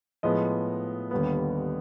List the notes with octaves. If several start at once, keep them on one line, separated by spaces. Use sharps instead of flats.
A2 F3 G#3 B3 D#5
D#2 D3 G3 B3